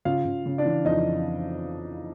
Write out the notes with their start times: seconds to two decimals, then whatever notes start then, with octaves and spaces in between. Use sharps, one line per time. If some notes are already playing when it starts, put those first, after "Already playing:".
0.05 C#3 F4 F5
0.25 C#3
0.46 C#3
0.58 D4 D5
0.65 E3
0.85 F2 D#4 D#5